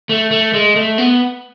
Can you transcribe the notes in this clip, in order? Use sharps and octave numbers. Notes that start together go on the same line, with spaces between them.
A3
A3
G#3
A3
B3